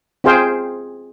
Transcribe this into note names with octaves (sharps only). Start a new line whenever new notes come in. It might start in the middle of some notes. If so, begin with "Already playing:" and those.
C4 F4 G#4 C5 F5 G5